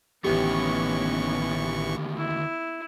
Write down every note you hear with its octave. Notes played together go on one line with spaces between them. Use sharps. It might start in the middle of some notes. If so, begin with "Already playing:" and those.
A1 D2 D#3 E3 B3 C#4 G4 C#6
E4